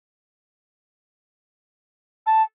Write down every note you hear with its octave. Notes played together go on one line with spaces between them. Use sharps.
A5